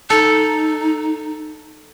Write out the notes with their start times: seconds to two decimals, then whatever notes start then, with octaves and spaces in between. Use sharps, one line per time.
0.10 D#4 A4